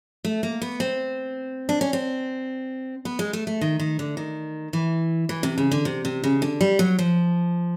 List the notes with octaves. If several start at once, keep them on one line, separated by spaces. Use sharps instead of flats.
A3
A#3
B3
C4
D4
C#4
C4
B3
G#3
A3
A3
D#3
D#3
D3
D#3
E3
E3
C3
C#3
D3
C3
C3
C#3
D3
G3
F#3
F3